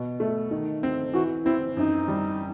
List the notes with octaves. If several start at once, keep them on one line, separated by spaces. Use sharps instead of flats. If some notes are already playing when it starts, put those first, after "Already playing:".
Already playing: B2
A3
D#3
C4
E3 F#4
C4 E4
F#2 D#4
G3